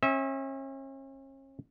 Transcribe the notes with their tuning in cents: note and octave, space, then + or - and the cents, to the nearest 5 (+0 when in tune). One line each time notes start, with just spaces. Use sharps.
C#4 -40 E5 -25